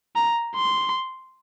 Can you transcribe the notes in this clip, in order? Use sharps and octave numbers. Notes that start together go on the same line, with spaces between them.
A#5
C6